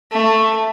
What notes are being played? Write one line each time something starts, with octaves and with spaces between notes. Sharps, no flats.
A3